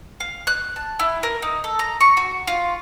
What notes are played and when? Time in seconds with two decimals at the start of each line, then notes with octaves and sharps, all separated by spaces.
0.20 F5
0.47 F#6
0.76 A5
1.00 E4
1.23 A#4
1.42 D#4
1.64 A4
1.79 A#5
2.01 C#6
2.17 F#4
2.47 F4